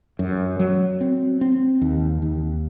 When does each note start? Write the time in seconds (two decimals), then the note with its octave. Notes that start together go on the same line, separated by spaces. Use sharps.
0.19 F#2
0.59 F#3
1.01 C4
1.41 C4
1.81 D#2
2.22 D#2